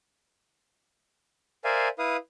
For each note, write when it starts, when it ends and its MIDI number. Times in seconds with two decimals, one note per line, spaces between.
1.64 1.88 70
1.64 1.88 72
1.64 1.88 74
1.64 1.88 76
1.64 1.88 77
1.64 1.88 80
1.99 2.17 64
1.99 2.17 71
1.99 2.17 77
1.99 2.17 87